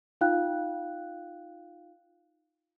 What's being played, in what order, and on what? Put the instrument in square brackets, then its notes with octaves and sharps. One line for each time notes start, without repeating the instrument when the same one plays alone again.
[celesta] D#4 F4 F5 G5 F#6